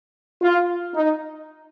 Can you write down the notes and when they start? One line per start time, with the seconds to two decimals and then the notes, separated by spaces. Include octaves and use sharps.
0.42 F4
0.95 D#4